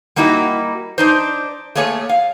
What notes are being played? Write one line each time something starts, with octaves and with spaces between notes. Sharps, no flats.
G3 A#3 D#4 E4 F#4
D4 D#4 C5
A3 A#3 G#4 C#5 G#5
F5